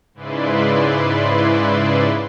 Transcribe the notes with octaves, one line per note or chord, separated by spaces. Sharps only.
G#2 C#3 E4 B4 D5 C6